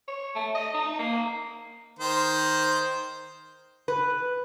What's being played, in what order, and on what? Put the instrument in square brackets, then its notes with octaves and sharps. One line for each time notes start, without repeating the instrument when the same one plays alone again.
[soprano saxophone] C#5
A3
D#5
D#4
A#3
[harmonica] D#3 C5
[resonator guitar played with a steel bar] B4